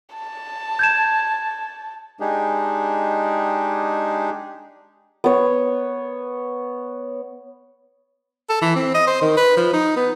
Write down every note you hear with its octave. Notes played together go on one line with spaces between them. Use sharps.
A5
G6 G#6 E7
G#3 D4 D#4 G4 G#4
B3 C#5
A4
E3
C4
D#5
C5
D#3
B4
F3
D#4
B3